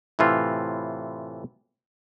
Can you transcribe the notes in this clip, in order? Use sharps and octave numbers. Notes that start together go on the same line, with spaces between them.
A2 C3 E3 F4